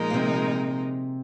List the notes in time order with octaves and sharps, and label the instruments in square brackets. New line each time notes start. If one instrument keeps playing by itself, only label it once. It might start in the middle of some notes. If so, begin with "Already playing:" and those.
Already playing: [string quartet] A#2 F3 G#3 D#4 A#4
[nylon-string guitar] A#3
C3 C4